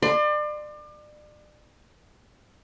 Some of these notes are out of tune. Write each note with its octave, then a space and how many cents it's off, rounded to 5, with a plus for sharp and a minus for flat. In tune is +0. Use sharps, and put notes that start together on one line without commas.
D5 +35 C6 +0